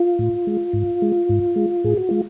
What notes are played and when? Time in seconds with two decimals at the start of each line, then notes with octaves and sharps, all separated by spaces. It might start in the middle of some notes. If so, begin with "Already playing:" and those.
Already playing: F4
0.19 A2
0.47 G#3
0.73 G#2
1.02 G#3
1.29 G#2
1.56 G#3
1.84 A2 G#4
1.97 F#4
2.09 G#3 F4